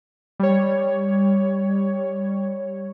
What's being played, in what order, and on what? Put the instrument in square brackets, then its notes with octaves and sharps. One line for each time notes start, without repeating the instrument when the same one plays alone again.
[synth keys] G3 C#5